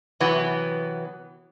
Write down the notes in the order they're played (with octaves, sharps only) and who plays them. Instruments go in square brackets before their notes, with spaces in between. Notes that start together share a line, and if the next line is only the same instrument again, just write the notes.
[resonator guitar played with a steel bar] C3 E3 F#3 B3